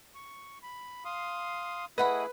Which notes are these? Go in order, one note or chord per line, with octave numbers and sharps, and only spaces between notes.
C#6
B5
F5 C6 D#6
A3 E4 G#4 B4 D#5 F#5 B5